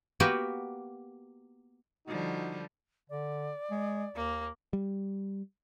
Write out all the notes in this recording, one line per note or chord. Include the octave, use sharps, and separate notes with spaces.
A#3 B3 F#4 G4 A#4 B4
D3 F3 G3 D#4 F#4
D3 D5
G#3
D#2 A#3
G3